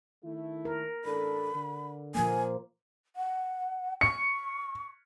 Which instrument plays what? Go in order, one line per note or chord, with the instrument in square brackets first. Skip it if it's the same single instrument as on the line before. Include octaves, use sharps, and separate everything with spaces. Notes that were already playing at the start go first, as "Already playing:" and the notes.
[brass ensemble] D#3 A3 E4
[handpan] A#4
[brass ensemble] A1 D4 A4 [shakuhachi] B5
[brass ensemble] D3
[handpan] A#2 F3 A#3 [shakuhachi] G#5
[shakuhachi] F#5
[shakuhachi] C#6 [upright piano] C#7